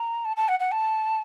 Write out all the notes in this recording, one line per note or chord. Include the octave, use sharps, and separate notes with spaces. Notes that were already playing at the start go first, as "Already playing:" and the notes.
Already playing: A#5
A5
A5
F#5
F#5
A5